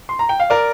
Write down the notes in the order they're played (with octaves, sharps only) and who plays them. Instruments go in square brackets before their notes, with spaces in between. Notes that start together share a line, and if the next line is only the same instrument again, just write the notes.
[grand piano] C6
A#5
G5
F5
A#4 D5